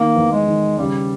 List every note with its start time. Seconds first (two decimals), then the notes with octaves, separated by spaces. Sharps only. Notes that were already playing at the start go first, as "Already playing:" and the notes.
Already playing: D#3 A#3
0.15 E2
0.32 G#3
0.47 D#3
0.78 C#3 G3